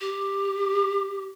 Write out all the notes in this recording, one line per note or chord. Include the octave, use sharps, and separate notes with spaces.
G4